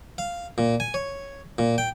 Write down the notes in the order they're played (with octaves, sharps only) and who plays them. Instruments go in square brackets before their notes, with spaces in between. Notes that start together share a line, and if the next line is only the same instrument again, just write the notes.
[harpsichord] F5
A#2
G#5
C#5
A#2
G5